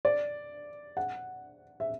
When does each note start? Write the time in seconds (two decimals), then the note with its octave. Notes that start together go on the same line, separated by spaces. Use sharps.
0.05 D5
0.97 F#5
1.80 E5